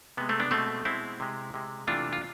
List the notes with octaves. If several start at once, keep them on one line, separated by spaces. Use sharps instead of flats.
C3 G#3 B3
A3 C4
B3 D4
B2 G#3 A3 C4
B2 G#3 C4 E4
C3 G#3
C3 G#3
C3 E3 A3 D4 F4
F4